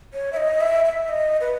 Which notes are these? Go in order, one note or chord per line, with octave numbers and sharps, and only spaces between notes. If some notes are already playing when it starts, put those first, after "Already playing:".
C#5
E5
D#5
E5
E5
D#5
B4